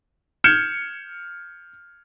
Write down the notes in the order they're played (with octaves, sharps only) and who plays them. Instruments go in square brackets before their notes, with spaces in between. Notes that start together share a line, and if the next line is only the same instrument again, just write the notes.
[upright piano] F6 G6 G#6 C#7 E7